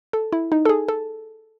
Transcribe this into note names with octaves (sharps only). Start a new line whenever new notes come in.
A4
E4
D#4
A4
G#4
A4